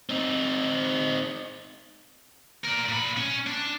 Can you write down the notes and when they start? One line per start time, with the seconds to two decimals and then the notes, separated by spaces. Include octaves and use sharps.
0.09 C4 D#4
2.64 A#4 D5
2.88 A#2 B5
3.17 C#4
3.46 D4